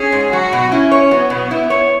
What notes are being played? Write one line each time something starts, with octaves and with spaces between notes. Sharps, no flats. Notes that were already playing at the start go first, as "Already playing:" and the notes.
Already playing: C#4 G#4
G#2
F#3 F#4
B2
C#4 E4
C#5
F#3 B3
B2
E4
C#5